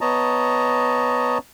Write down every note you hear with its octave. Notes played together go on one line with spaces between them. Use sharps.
B3 C#5 D#5 A5 A#5